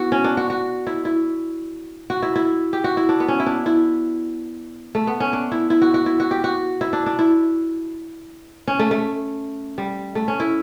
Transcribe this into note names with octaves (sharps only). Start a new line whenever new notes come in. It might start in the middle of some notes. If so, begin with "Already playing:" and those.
Already playing: B3 E4 F#4
C#4
D4
F#4
F#4
E4
E4
F#4
E4
E4
G4
F#4
E4
D4
B3
C#4
E4
D4
E4
A3
B3
C#4
D4
E4
E4
F#4
F#4
E4
F#4
G4
F#4
E4
D4
D4
E4
C#4
A3
A3
G3
A3
C#4
E4